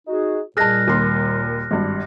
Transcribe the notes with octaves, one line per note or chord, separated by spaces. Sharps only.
D#4 F#4 G#4
A#2 G3 G#4 D#5 A5 F6 F#6 A#6
D#2 A#4 C6
G#1 G2